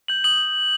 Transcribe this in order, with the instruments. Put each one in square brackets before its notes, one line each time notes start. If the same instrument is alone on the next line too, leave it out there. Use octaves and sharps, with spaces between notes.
[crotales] G6 F#7
D#6 F#7